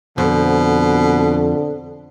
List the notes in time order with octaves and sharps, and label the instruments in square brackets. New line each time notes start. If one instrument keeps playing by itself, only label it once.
[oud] F2 [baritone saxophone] B2 [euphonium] D3